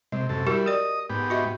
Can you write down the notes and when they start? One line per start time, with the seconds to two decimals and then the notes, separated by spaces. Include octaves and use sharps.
0.12 C3 G#3
0.29 F#2 C3 A4
0.47 G3 E4 F#4 G4 A#4
0.66 A#4 D5 D#5 D#6
1.10 G#2 B3 G4
1.30 F#4 D#5 E5